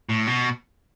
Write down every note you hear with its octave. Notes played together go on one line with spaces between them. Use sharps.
A2
B2